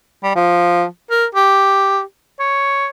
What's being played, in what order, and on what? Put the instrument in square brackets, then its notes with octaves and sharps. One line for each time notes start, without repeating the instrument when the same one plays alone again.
[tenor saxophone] G3
F3
A#4
G4
C#5